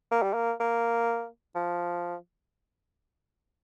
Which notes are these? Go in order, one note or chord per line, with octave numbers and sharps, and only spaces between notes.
A#3
G3
A#3
A#3
F3